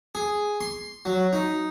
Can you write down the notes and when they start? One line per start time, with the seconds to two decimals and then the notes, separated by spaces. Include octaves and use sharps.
0.15 G#4
0.61 C6
1.05 F#3
1.33 D#4